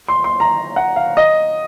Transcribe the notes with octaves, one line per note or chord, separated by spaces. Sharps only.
C6
C6
A#5
F#5
F5
D#5